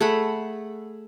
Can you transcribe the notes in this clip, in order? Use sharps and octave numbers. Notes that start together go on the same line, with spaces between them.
A3 G#4 F#5 B5